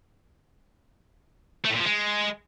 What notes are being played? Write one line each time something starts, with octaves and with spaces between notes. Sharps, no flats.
A3
A2
A#2
F3
G#3